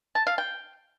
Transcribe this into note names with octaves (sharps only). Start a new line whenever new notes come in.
A5
F5
G5